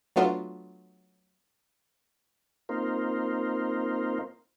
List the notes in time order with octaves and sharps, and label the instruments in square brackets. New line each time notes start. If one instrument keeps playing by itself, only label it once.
[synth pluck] F#3 A3 B3 D4 F4 F#4
[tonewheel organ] A#3 C4 D#4 F4 A#4 C5